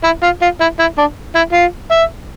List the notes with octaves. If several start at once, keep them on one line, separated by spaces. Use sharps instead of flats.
E4
F4
F4
E4
E4
D4
E4
F4
E5